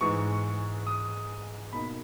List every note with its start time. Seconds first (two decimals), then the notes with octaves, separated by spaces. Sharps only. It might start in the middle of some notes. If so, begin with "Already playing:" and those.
0.01 G#2 E3 G#3 D#4 C#6
0.87 D#6
1.73 B2 A#3 D#4 B5